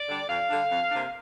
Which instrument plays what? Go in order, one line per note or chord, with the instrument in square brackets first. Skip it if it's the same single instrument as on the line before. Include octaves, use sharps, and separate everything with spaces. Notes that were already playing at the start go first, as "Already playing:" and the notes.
Already playing: [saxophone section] D5
D3 G3 D4
F2 F5
D3 G3 D4
F2
C3 A#3 D4